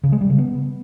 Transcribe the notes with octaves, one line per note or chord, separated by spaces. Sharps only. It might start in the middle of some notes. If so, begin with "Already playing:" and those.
C#3
G#3
G3
C#3
B3